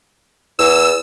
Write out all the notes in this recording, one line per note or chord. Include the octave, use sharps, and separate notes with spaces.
E2 E6